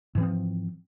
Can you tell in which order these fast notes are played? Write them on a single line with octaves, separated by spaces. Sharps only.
G#2 E3 C4 F3